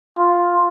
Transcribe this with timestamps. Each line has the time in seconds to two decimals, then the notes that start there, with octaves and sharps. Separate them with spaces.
0.18 F4